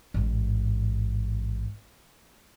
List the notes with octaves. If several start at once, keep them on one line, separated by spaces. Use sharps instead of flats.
A1 G#2